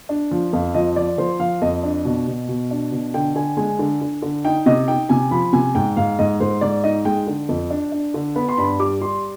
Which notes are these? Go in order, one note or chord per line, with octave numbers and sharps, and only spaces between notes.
D4
F3
F2 F5
F3 D#5
F3 D5
F3 C5
F3 F5
F2 D#5
D4
B2
B2
B2
D4
B2
D3 G5
D3 G#5
G#3 G#5
D3
D3
D3
D#4 G5
C3 D#5
D#4 G5
C3 G#5
F3 B5
C3 G#5
G#2 G5
G#2 F5
G#2 D#5
G#2 C5
G#2 D5
D#4 D#5
G#3 G5
D3
F2
D4
D4
D3
B3 B5
C6
G2 B5
G3 D6
G3 C6